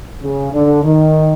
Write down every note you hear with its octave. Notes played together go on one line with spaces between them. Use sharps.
C#3
D3
D#3